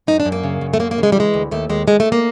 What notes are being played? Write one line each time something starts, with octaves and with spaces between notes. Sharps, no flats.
F#2 D#4
D4
F#2
A#3
C#3
F#2
A3
C#3 A#3
A#3
C#3
G#3
G3
E3 G#3
D2
D#2 A3
D#2 G#3
D#2 G#3
A3
D#2
A#3